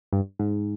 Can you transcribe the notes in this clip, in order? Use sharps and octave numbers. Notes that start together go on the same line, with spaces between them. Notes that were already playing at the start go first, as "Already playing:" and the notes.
G2
G#2